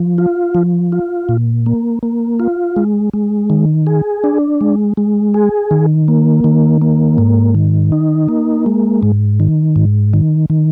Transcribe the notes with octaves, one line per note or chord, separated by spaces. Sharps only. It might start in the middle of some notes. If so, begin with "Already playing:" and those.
Already playing: F3
F4
F3
F4
A#2
A#3
A#3
F4
G#3
G#3
D#3
G#4
D4
G#3
G#3
G#4
D#3
A#3
D#3
A#3
G#2
D#3
D#4
A#3
G#3
G#2
D#3
G#2
D#3
D#3